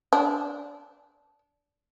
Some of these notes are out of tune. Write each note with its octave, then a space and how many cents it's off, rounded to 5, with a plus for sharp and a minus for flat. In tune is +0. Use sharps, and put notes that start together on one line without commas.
D4 -20